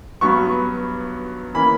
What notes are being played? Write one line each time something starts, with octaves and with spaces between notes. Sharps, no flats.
G2 F#3 B3 C#6
E3 A#3 C#4 B5